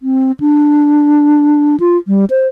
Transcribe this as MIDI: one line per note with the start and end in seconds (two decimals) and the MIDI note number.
0.02 0.32 60
0.40 1.76 62
1.80 1.97 65
2.08 2.25 55
2.30 2.47 72